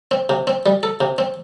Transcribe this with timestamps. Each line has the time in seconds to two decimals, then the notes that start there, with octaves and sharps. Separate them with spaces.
0.11 C4
0.29 C3
0.47 C4
0.66 G3
0.83 A4
1.01 C3
1.18 C4